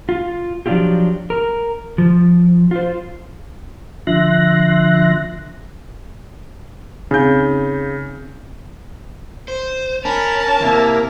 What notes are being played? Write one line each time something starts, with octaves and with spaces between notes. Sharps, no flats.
F4
F3 F#3 D4 E4 F4 G4
A#4
F3
F4 C5
D3 F3 E5 C6 F#6 A#6
C#3 C4 D#4 G6
C5
C#4 A#4 A5 B5
C3 A#3 E4